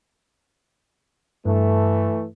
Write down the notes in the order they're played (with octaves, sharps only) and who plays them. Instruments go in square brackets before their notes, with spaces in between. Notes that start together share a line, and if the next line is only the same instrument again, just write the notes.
[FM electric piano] G2 [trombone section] E3 A3